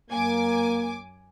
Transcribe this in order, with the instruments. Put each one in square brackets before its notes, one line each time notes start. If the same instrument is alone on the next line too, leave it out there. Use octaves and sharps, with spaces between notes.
[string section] F#2 G#5 D6 [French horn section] A#3